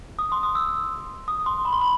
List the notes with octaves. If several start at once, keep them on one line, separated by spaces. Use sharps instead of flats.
D#6
C6
D#6
E6
D#6
C6
B5
C6
B5